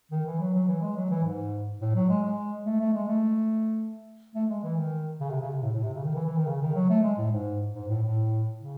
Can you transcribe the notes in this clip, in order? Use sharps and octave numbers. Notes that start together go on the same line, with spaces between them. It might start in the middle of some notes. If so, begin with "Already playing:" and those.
D#3
E3
F#3
F#3
E3
G#3
F#3
E3
G#2
A2
F#3
G#3
G#3
A3
A3
G#3
A3
A3
G#3
E3
D#3
C#3
C3
C#3
C3
A2
A2
C3
C#3
D#3
E3
E3
D#3
C#3
D#3
F#3
A3
G#3
A2
G#2
G#2
A2
A2
C#3